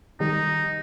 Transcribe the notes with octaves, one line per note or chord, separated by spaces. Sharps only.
D#3 G3 D#4